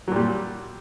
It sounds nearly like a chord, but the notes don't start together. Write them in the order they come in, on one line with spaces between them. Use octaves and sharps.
F#3 A#2 G3